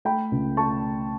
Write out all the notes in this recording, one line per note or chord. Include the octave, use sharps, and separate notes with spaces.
A3 G5 B5
C#2
A3 A5 C#6